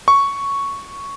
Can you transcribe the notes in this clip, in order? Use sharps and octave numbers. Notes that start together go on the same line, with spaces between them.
C#6